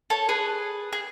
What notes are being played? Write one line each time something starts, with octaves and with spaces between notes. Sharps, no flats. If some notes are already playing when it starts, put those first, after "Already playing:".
A4 C#5
G#4 B4
G#4